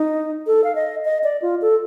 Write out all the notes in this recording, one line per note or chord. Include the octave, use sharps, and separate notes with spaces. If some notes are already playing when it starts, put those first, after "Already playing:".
Already playing: D#4
A4
F5
D#5
D#5
D5
F4
A4